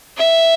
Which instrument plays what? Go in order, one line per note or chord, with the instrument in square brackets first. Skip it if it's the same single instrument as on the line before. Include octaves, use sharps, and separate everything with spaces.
[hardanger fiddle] E5